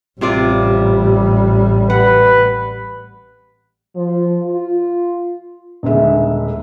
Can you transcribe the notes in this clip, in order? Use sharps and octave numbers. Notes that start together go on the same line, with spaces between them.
A1 C3 G3 F4 D5
B4 F#5
F3
F4
D#1 B1 D3 G#3 E5